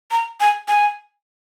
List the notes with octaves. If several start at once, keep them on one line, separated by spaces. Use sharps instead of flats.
A#5
G#5
G#5